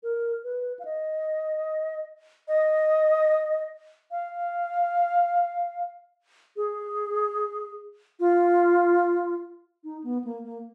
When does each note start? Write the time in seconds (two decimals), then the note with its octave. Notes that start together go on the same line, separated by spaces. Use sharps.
0.03 A#4
0.44 B4
0.79 F5
0.85 D#5
2.48 D#5
4.11 F5
6.57 G#4
8.20 F4
9.84 D#4
10.04 B3
10.25 A#3
10.44 A#3